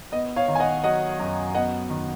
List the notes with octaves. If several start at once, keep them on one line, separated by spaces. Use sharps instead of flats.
B3 D#5
C#5 F5
D#3
G#5
D#5 F#5
F#3 D#5 F#5
F#2
B3 D#5 F#5
D#3